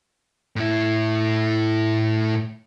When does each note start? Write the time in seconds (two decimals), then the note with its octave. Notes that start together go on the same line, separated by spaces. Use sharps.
0.56 A2 E4